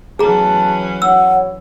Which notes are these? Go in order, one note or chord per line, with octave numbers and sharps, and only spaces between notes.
E2 E3 F#3 A3 C#4 G#4 A5 A#5
E4 F#4 C#5 F#5 E6